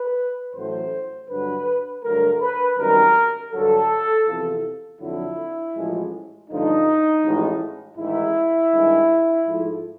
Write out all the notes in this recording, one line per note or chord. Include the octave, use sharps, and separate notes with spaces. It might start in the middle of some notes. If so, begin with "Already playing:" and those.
Already playing: B4
A1 A2 F#3 A3 C5
G2 D3 F#3 B4
G2 D3 F#3 A3 A#4
B4
G#1 F#2 D#3 G3 A#4
G2 D3 F#3 A4
E2 C3 F3
F2 D3 F#3 E4
A1 A2 F3 G#3
A1 G2 D3 F3 A3 D#4
A1 A2 F3 G#3
A1 G#2 D#3 E4
G2 D#3 G#3
G#2 F3 A3